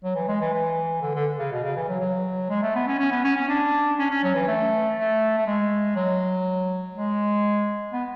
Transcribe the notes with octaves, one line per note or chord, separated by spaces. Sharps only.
F#3
E3
G#3
E3
E3
D3
D3
C#3
B2
C#3
E3
F#3
F#3
G#3
A3
B3
C#4
C#4
B3
C#4
C#4
D4
C#4
C#4
F#3
E3
A3
A3
A3
G#3
F#3
G#3
B3